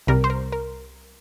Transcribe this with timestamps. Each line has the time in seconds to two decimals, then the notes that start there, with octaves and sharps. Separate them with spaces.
0.07 C2 C3 G3 A#4
0.24 C5
0.30 A#4
0.52 A#4